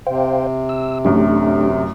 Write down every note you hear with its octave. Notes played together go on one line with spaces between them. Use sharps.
C3 C5 F5 G5
E6
A1 F#2 A3 D4 G4